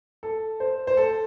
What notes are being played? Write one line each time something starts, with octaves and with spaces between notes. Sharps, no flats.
A4
C5
C5
A4